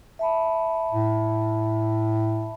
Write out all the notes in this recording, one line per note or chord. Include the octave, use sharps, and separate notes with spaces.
E5 A5 B5
A2